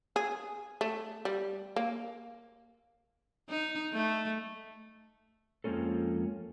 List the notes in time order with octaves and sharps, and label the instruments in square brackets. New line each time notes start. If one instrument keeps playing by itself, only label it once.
[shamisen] G#4
A3
G3
A#3
[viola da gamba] D#4
A3
[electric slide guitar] F2 F3 G#3 A#3 C#4 A4